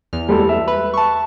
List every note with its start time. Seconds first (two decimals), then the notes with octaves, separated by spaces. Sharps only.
0.13 E2 F6
0.29 G3 G#3 A4
0.49 E5
0.68 B4
0.94 A5 C#6